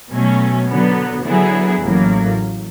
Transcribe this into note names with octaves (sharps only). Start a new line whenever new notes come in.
B2 F#3 A3 C#4
D3 F#3 B3
D3 F#3 B3 E4 G#4
A1 A2 F#3 A#3